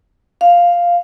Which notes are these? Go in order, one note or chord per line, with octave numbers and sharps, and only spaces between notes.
F5